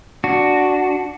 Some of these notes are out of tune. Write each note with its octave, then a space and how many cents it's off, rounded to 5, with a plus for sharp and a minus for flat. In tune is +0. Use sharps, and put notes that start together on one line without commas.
D4 +0 F#4 +0